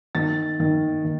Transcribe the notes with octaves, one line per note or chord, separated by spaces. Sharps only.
D#3 A6
D#3
D#3